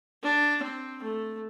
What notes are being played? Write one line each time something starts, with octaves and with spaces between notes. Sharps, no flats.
D4
C4
A3